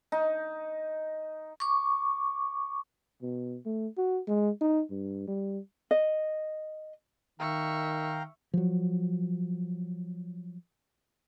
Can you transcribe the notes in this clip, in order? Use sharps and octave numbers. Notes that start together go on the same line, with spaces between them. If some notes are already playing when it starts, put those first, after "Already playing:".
D#4
C#6 D6
B2
A3
F#4
G#3
D#4
G2
G3
D#5
D#3 E5 F5 G5 A#5 C#6
F3 F#3